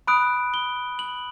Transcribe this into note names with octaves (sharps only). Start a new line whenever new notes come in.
B5 D#6 F#6 D7
G7
F#7